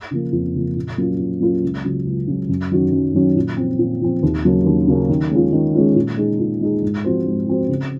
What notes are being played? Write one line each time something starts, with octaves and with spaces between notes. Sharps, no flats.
C#3 F3 A#3
F2
C#3 F3 A#3
A#2
F#3 A#3 C#4 F4
A#2
F#3 A#3 C#4 F4
C#2
C#3 F#3
C#2
C#3 F#3
F#2
D#3 F#3 C#4 F#4
F#2
D#3 F#3 C#4 F#4
A#2
F3 C4
A#2
F3 C4
D#2
C#3 F#3 A#3 C#4
D#2
C#3 F#3 A#3 C#4
D#3
G#3 C#4 F4
D#3
G#3 C#4 F4
A#2
G#3 D#4 G#4
A#2
G#3 D#4 G#4
G#2
F3 C4 F#4 C5
G#2
F3 C4 F#4 C5
C#3